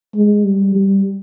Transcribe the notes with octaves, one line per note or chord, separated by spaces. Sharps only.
G#3
G3
G3